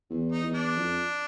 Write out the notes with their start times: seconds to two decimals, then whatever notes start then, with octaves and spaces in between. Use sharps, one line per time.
0.10 E2
0.32 D#4
0.43 E2
0.55 D4
0.76 F2